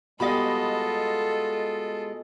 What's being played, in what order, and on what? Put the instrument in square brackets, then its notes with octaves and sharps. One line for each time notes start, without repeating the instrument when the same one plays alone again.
[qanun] B2 G3 D6 [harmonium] G#3 [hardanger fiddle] F4 A4 [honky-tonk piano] D#5 B5